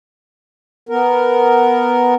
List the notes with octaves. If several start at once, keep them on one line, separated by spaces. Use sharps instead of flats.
B3 A#4